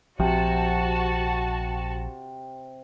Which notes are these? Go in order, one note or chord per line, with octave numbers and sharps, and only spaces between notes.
A#1 C3 F3 F#4 A5